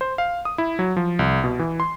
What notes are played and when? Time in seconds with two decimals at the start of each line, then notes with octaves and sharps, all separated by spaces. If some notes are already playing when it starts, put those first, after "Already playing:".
0.01 C5
0.18 F5
0.45 D#6
0.58 E4
0.79 F#3
0.97 F3
1.19 C2
1.44 B2
1.59 E3
1.80 C6